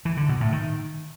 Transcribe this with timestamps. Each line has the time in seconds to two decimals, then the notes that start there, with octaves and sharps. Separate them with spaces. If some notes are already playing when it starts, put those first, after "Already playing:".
0.05 E3
0.17 D3
0.29 B2
0.41 A2
0.52 D#3